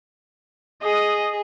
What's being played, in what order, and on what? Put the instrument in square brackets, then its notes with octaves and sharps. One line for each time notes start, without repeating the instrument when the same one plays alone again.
[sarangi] G#4 [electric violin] D#5